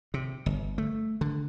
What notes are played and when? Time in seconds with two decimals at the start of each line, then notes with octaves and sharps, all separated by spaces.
0.14 C3
0.46 G1
0.78 A3
1.21 D3